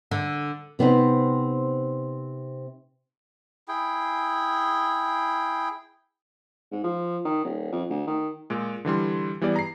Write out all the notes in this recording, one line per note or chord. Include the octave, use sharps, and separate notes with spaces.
D3
C3 B3 C4 D#4
E4 G#4 G5
G#2
F3
D#3
D#1
F2
D2
D#3
A#2 G#3
D3 E3 G3 C6
E3 G3 B3 G#4 D5
A#5 C7